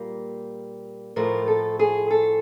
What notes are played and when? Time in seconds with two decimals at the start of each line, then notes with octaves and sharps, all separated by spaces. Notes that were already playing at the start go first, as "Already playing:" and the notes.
Already playing: A#2 G3 A#3
1.16 A2 F3 A3 A#4
1.48 A4
1.79 G#4
2.11 A4